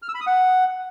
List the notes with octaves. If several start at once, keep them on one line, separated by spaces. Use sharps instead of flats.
F6
E6
B5
D#6
F#5